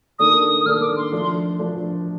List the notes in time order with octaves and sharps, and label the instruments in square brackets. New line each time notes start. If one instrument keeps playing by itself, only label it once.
[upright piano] D#3 A#3 D4 A4 [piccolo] D#6
[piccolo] D#6
[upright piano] D#3 A#3 D4 A4 [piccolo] F6
[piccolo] D6
C6
[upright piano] F3 A3 D4
F3 A3 D4